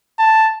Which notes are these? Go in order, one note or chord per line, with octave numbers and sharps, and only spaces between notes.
A5